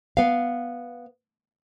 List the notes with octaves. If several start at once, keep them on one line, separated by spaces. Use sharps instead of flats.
B3 F5